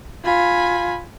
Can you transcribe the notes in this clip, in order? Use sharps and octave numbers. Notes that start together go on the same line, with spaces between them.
F4 G#5 B5